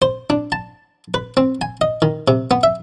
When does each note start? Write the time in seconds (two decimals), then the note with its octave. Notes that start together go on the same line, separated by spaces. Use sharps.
0.02 C5
0.30 D4
0.52 A5
1.14 B4
1.37 C4
1.61 G#5
1.81 D#5
2.02 D#3
2.28 C3
2.51 B3
2.63 E5